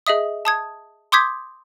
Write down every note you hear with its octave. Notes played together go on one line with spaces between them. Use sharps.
G#4 D#5 E5 D#6
A5 D#6 G#6
C6 D6 D#6 G6 G#6 B6